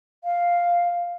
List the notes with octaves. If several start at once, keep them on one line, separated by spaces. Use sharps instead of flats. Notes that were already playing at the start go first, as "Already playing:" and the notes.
F5